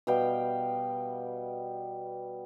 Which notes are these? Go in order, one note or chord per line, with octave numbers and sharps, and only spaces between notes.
B2 G3 F5 G5